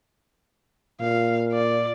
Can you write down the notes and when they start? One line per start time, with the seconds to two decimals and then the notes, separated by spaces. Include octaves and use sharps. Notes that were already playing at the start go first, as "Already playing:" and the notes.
1.01 A#2 F5
1.53 D5